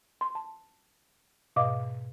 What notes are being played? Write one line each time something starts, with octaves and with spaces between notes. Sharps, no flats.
C6
A5
G#2 B2 D#5 F5 D6